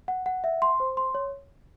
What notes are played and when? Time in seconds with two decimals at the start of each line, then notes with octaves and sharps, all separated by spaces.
0.08 F#5
0.26 F#5
0.44 E5
0.62 C6
0.80 C5
0.97 C6
1.15 C#5